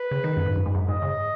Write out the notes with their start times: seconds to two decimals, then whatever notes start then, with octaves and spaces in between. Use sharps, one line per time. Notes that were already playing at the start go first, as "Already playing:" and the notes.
Already playing: B4
0.11 C#3
0.24 D#3
0.37 F#2
0.46 G#2
0.56 F#2
0.66 G#2
0.75 F#2
0.89 G#2 D#5
1.02 C#3